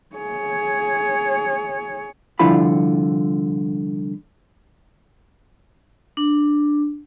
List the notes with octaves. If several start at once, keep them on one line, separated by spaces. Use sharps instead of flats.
G#4 C#5
C2 D3 F3 E4 F4 B5
D4